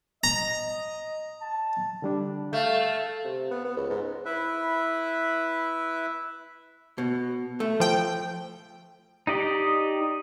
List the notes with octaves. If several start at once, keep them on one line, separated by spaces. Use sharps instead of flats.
D#5 A#5
A5
D3 G3 D4
A3 F5 G6
C3
B3
B3
C#2
G#2
E4 B4 E5
B2
A3
F3 G5
D#4 G4 D5 D#5